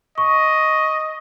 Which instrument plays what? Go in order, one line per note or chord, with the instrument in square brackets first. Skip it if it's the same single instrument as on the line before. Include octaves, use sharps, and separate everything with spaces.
[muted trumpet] D#5 [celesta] C#6